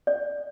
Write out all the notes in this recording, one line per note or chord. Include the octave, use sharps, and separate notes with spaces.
D5